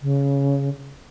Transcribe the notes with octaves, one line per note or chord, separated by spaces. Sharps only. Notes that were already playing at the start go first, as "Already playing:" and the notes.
C#3